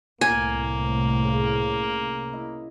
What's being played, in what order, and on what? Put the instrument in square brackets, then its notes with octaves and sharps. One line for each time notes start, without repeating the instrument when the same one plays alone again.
[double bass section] C2 A2 C3 [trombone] A#3 [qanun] G#5
[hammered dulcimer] C#3
E4 D#5